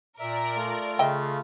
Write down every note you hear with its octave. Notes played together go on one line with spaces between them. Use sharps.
A#2 A#4 D5 E5
A3 F4
C#3 D#5 E5 G5